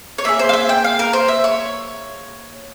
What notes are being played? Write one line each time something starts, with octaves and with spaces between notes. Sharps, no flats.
C#5
A#3 E4 G#4 E5
C5
F5
E5
G5
F5
A#4
C5
E5
C#5